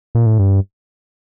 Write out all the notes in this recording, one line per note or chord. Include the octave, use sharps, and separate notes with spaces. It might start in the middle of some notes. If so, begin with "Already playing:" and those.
A#2
A2
G2